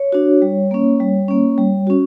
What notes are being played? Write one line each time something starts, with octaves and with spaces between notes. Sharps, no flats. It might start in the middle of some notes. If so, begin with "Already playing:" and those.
Already playing: C#5
D4 F#4
G3
A#3 C#4
G3
A#3 C#4
G3
C#4 F#4